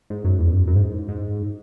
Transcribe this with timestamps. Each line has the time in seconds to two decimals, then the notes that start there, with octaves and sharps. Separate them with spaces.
0.10 G#2
0.25 F#2
0.39 E2
0.52 F#2
0.68 F#2
0.76 G#2
1.08 G#2